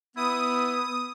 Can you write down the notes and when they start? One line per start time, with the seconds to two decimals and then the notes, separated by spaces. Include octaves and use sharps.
0.16 B3 E4 D#6